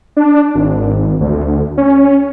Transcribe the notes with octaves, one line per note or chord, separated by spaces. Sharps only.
D4
G#1
D2
C#4